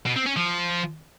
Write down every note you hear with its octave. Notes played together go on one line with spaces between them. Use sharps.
B2
C4
C#4
F3